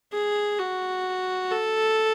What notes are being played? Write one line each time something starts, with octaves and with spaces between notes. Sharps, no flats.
G#4
F#4
A4